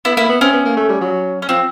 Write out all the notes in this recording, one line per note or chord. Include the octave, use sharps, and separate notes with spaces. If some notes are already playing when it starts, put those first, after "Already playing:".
B3 E4
A#3 E4
B3
C4 C#4
B3
A#3
A3
G3
F#3
C#4
F3 C4